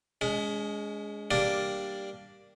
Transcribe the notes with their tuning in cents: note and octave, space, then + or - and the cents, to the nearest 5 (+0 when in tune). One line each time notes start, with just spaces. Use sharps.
G#3 +0 C#4 +45
G3 +0 A#3 +0 D4 +0